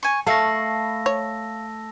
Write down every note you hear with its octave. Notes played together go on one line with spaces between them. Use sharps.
G#5 C#6
A3 F5 A5 B5 C#6 E6 A#6
C#5